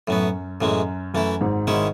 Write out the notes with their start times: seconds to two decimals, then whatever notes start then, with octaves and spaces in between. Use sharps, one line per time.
0.07 F#2 A2 F#3 B3
0.61 F#2 A2 E3 G#3
1.14 F#2 E3 A3 E4
1.41 G#1 G#2
1.67 G#1 G#2 D#3 G#3 C#4 E4